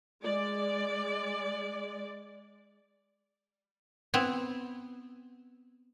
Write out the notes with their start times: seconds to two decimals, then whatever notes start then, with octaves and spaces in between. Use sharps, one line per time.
0.23 G#3 D5
4.14 B3 C4 E4